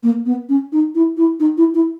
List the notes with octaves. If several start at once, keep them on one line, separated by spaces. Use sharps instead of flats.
A#3
B3
C#4
D#4
E4
E4
D#4
E4
E4